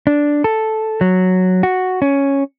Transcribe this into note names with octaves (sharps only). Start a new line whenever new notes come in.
D4
A4
F#3
F#4
C#4